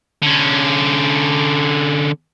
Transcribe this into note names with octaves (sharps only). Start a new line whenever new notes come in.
D3 C#4